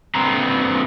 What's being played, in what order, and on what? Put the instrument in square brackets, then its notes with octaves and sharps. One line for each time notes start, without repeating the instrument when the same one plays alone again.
[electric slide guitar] G2 B3 C4 C5 A#5